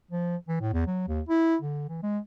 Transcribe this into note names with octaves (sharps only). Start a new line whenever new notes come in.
F3
E3
A2
E2
F#3
D#2
E4
D3
E3
G#3